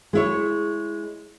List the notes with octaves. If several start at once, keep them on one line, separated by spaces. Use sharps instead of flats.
G#3 E4 C#5